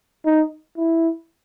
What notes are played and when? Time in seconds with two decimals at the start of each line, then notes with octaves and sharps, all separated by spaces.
0.26 D#4
0.78 E4